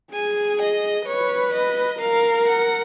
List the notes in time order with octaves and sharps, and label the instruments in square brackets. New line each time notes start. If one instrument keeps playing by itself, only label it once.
[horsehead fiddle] G#4 [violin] G#5
[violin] D#5
[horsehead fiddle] B4 [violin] C#5
[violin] D#5
[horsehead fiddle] A#4 [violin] F5
[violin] F#5